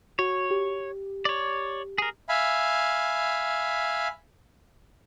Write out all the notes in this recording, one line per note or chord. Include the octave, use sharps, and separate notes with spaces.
F#4 C#5
G4
C#5 D5
G#4 A#4
E5 F5 G#5 B5